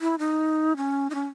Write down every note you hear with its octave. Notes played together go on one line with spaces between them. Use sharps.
E4
D#4
C#4
D#4
C#4